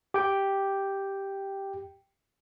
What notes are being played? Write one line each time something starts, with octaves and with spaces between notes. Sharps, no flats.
G4 G5